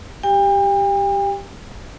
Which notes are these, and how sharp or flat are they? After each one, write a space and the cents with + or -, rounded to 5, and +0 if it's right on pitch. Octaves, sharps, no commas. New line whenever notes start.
G4 +0 G5 +40